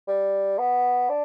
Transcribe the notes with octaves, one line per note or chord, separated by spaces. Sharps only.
G3
B3
D4